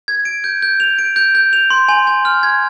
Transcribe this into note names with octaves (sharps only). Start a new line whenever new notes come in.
G#6
D7
G6
G6
F7
D7
G6
G6
F7
C6
G#5
G#5
F6
G#6